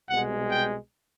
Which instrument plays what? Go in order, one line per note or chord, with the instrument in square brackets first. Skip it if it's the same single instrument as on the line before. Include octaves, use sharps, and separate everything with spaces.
[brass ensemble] C2 B2 G#3 F#5
G5